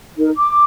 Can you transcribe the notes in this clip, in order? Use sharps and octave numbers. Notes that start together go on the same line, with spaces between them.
D#4 A#4
D6